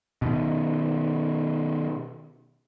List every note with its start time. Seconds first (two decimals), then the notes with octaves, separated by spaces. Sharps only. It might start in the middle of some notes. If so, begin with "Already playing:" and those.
0.22 B2 D#3